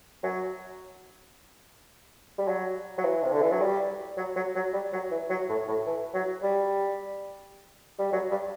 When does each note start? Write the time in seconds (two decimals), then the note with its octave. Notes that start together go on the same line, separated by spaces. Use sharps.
0.23 F#3
2.38 G3
2.48 F#3
2.98 F#3
3.05 E3
3.23 C3
3.33 D3
3.42 E3
3.52 F#3
3.62 G3
4.17 F#3
4.36 F#3
4.55 F#3
4.73 G3
4.93 F#3
5.11 E3
5.30 F#3
5.49 A2
5.68 A2
5.86 E3
6.14 F#3
6.43 G3
7.99 G3
8.12 F#3
8.31 G3